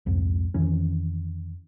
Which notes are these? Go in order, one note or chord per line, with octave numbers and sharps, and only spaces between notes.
C2 F2 G#2
F2 D#3 E3 C#4